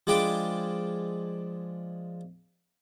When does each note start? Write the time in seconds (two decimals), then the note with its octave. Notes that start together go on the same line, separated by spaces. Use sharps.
0.07 F3 G#3 D4 G5 B5 D6